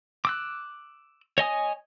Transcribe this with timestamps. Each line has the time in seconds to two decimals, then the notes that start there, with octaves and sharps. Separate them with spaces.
0.25 D6 E6 F#6
1.38 C#5 D#5 G#5 D#6